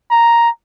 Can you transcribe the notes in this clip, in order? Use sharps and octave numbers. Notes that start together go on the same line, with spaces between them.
A#5